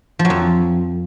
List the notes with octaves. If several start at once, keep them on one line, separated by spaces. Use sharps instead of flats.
F3
F#3
F2